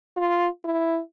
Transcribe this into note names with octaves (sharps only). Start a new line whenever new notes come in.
F4
E4